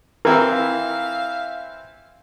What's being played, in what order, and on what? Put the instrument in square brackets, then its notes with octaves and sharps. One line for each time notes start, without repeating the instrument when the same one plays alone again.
[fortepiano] E3 C4 E4 [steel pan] A#4 [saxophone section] E5 F5